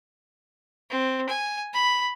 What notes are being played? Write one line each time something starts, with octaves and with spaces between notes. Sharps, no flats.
C4
G#5
B5